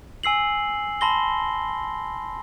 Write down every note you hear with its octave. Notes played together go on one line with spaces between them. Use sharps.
G#5 E6 C7 F#7
A5 B5 C6 A#6 G7